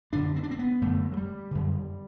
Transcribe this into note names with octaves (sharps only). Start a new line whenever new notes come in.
F#2 D3 D4
C4
D4
C4
B3
F#2 D3 A3
F#3
G3
F#2 D3